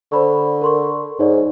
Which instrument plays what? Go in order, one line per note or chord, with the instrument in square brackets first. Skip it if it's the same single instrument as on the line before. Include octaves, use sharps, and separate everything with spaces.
[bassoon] D3 [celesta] C5 B5 C#6
[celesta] A#4 C6 C#6
[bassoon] G#2 [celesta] D#4 C#5 D5